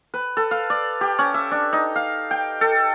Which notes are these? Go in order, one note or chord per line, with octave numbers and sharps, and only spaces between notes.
B4
A4
F5
D5
G4
C#4
E5
D4
D#4
F5
G5
A4